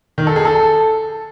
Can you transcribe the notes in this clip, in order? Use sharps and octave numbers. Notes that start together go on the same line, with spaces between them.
D#3
A4
G#4
A4